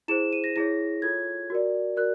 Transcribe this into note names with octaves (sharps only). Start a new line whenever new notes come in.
E4 G#4 C5 E7
D#7
A#6
E4 G#4 C#5 A#6
F4 A4 C#5 G#6
F#4 A#4 D5
F#4 A#4 D5 F#6